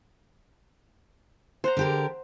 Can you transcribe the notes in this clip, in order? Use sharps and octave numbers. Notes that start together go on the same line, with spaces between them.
C5 F#5 A#5
D3 G4 A#4